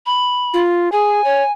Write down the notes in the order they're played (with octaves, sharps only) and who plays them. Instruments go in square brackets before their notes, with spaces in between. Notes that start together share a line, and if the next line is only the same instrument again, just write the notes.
[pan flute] B5
[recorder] F4
[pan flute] G#4 [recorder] G#5
[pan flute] C#5